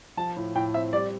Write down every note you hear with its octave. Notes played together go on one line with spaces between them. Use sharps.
F3 A5
A2
A2 G5
C4 E5
G3 D5